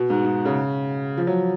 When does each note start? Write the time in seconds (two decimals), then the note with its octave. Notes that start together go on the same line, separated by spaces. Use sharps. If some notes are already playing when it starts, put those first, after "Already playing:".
Already playing: B2
0.10 G#2
0.25 G#2
0.45 C#3
1.17 F3
1.27 F#3